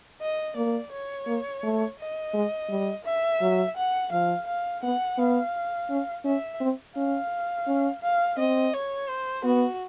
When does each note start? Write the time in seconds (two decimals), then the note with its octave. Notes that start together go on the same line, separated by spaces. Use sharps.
0.21 D#5
0.56 A#3 D5
0.92 C#5
1.27 A#3
1.63 A3
1.99 D#5
2.34 G#3
2.69 G3
3.05 E5
3.41 F#3
3.76 F#5
4.12 F3 F5
4.47 F5
4.83 B3 F#5
5.18 B3 F5
5.90 C#4
6.25 C#4 E5
6.61 C4
6.96 C#4 F5
7.67 C#4
8.02 F5
8.38 C4 D#5
8.74 C#5
9.09 C5
9.44 B3 F#4